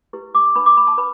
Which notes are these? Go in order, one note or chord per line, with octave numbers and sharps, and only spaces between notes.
E4 G4 B4
D6
D4 B4 B5
D6
B5
A5
B4 B5